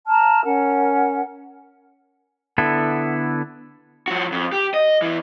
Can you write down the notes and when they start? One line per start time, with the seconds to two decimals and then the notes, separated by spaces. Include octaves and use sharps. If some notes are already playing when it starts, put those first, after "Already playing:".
0.07 A5 A#5 F6
0.43 C#4 A#4 F#5
2.58 D3 B3 E4 A4
4.08 F3 F#4
4.32 F2
4.52 G4
4.74 D#5
5.02 E2 E3